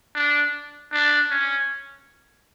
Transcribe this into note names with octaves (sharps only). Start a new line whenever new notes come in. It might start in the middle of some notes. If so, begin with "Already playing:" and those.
D4
D4
C#4